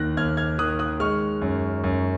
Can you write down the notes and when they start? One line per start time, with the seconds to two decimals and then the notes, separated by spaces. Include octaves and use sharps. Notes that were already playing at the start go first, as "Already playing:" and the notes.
Already playing: D#2 D#3 F#6 A#6
0.17 D#2 F6 G#6
0.37 F6 G#6
0.58 D#3 D#6 F#6
0.79 D#6 F#6
1.00 G#3 C#6 F6
1.42 F#2
1.84 F#2